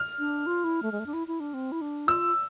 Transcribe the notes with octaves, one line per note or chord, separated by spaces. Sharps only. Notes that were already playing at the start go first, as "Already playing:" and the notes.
Already playing: F6
D4
F4
E4
A3
G#3
A3
D4
E4
E4
D4
C4
E4
D4
F4 E6